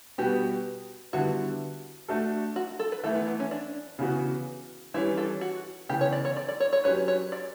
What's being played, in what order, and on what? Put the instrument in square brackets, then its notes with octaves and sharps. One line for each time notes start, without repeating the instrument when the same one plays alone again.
[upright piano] B2 G3 B3 F#4 [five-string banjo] G4
[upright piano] D3 G3 B3 E4 [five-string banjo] F#4
[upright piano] A3 D4 F#4 A4
[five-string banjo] F#4
A4
B4
[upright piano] E3 A3 E4 [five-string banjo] A4
[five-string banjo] B3
B3
C#4
D4
[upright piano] C#3 E3 B3 F#4
[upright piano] E3 G3 C#4 [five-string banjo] E4
[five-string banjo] A4
F#4
[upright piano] C#3 E3 B3 [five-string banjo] G4
[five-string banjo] C#5
D5
C#5
D5
D5
C#5
C#5
[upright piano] F#3 C#4 G4 B4 [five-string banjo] C#5
[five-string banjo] C#5
D5